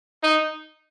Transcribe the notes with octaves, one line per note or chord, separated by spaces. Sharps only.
D#4